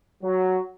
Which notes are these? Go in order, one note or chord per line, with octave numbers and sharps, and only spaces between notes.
F#3